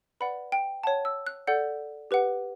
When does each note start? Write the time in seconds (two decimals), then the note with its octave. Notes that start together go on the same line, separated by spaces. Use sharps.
0.20 B4 D5 F#5 B5
0.52 G5
0.84 C#5 F#5 A5
1.05 E6
1.27 F#6
1.47 A4 D5 F#5 G6
2.11 G4 B4 F#5